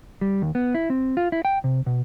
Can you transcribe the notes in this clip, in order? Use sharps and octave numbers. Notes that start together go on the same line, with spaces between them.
G3
D#2
B3
E4
C4
F4
E4
G5
C3
B2